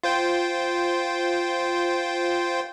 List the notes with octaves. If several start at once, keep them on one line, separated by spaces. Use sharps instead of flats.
F4 C5 G5